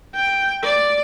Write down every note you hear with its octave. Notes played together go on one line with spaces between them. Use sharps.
G5
D5